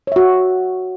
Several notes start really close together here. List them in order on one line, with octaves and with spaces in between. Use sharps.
C#5 E5 F#4